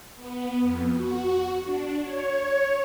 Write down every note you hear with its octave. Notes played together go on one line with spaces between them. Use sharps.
B3
F2
F#4
D4
C#5